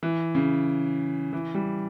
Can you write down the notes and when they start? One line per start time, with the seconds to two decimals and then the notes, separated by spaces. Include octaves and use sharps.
0.03 E3
0.35 C#3
1.33 E3
1.55 G3